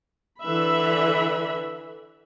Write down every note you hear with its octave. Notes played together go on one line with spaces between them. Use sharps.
D3 E3 B4 E5 B5